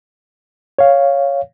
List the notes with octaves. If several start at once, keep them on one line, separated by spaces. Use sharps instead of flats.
C#5 F5